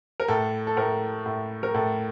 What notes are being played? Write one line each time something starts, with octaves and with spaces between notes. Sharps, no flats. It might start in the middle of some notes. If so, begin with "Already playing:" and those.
A#4
A2 A4
A4
A2 A#4
A2
A#4
A2 A4